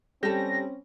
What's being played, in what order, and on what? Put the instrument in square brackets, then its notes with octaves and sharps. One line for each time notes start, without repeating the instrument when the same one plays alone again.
[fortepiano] G3 [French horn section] C4 C#4 [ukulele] G4 A4 [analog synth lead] A#6